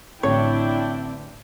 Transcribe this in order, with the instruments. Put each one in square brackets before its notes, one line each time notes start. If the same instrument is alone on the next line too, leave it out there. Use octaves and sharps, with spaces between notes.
[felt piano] A1 D3 [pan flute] C4 [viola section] D4 E4 G5 [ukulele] C#5